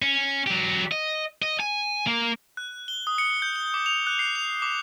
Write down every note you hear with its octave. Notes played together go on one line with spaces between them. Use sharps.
C#4
F#3 G4
D#5
D#5
G#5
A#3
F#6
G7
D#6
C#7
G6
G7
D6
F7
F#6
C7
F7
D6